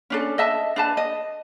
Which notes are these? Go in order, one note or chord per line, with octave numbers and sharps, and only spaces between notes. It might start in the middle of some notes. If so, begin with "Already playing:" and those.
C#4 D4 A4
D#5 E5 A5
D4 B4 A5
D#5